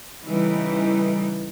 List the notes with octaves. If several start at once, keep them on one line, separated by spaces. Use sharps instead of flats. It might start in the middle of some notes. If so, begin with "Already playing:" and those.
C#3 E3 G3 A3 D#4